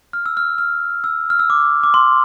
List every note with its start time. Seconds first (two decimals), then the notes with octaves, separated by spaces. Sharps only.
0.13 F6
0.26 E6
0.37 F6
0.58 F6
1.04 E6
1.30 F6
1.39 E6
1.50 D6
1.84 D6
1.94 C6